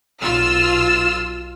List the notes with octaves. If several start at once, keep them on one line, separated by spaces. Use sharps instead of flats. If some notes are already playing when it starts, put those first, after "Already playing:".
B1 F4 E6 F6